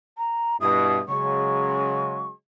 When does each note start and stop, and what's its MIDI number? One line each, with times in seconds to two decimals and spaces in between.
0.18 0.57 82
0.61 0.98 43
0.61 0.98 47
0.61 0.98 64
0.61 0.96 87
1.09 2.29 49
1.09 2.29 54
1.09 2.29 56
1.09 2.28 85